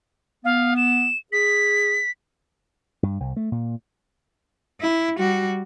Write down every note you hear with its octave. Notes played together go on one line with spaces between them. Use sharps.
B3 F5
E7
G#4 B6
G2
C2
A3
A#2
E4
G3 F#4